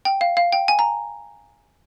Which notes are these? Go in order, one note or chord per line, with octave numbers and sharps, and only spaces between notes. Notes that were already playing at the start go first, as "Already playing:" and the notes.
G5
F5
F5
G5
G#5
A#5